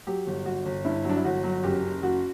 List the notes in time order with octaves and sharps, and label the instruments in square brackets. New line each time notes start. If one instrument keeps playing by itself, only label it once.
[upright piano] F#3 G4
G1
G1 F#4
G1
G2 E4
F#3 D4
E4
G1 F#4
F#3
F#1 G4
F#2
F#1 F#4